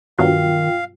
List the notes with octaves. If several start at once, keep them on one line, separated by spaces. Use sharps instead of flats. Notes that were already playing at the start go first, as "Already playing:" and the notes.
G2 B2 D#3 F#3 F4 F5 G5